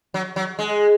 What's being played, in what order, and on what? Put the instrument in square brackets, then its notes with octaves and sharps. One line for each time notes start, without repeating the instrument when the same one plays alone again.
[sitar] F#3
F#3
G#3